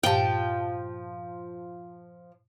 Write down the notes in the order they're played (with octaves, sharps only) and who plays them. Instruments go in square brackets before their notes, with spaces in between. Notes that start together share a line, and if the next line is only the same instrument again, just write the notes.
[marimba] G2 A#2 G4 [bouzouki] F3 A5 [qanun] G5